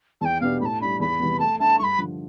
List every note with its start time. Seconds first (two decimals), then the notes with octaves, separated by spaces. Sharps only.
0.21 E2 A5
0.25 G5
0.41 B2 B3 D4 G4 F5
0.61 A2 A5 B5
0.81 G3 D4 B5
1.00 E2 B5
1.20 C3 E3 G3 B3
1.40 A3 A5
1.59 D4 A4 E5 A5
1.79 G2 B5 C#6
1.98 D3 F3